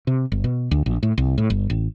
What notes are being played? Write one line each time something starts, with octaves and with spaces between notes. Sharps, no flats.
C3
G1
B2
D2
A#1
A2
C2
A2
G1
A1